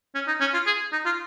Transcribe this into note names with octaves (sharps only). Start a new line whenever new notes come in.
C#4
D#4
C#4
F4
G#4
D#4
F4